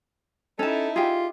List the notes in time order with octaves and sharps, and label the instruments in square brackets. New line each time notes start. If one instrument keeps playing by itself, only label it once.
[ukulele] C#4 A5 [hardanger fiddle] D#4 E4 [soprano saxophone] A4
[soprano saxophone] F4 [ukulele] G4 G#4